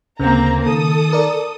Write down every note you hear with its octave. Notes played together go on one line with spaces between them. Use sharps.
D2 C#3 A#3 C4 A#5
D#3 A4 D#6
A#4 D5